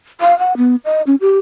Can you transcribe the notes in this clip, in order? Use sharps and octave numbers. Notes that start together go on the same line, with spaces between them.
F5
F#5
B3
D#5
C#4
G4